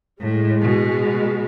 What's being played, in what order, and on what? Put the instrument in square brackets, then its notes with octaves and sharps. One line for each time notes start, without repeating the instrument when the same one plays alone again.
[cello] A2 [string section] G#3
[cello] B2